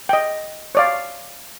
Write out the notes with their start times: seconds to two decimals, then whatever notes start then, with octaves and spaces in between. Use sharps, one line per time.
0.09 D#5 G5
0.75 C#5 D5 F5